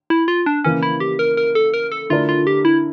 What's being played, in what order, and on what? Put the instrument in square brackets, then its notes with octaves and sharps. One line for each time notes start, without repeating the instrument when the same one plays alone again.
[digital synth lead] E4
F4
D4
[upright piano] C#3 E3 A#3 [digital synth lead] C#4
[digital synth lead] E4
G4
A#4
A#4
A4
A#4
A4
[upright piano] D3 A3 E4 A#4 D5 [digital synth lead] F4
[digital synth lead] F4
G4
E4